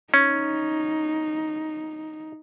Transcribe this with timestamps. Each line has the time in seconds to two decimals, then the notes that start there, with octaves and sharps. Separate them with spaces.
0.14 C#4 D#4